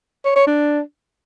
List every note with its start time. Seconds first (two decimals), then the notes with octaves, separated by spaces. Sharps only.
0.25 C#5
0.36 C#5
0.47 D4